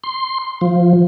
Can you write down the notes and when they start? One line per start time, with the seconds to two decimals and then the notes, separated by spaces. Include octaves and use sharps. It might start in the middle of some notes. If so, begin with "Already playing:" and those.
0.04 C6
0.61 F3